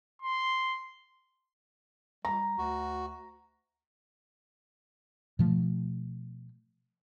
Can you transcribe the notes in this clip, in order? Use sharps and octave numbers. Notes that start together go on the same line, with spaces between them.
C6
G3 A#5
D2 F#4
B2 F3 A3